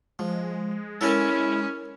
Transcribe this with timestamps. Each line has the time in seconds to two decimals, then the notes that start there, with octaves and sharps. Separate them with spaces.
0.19 F3 G#3
1.01 C#4 E4 A4 A#4 G#5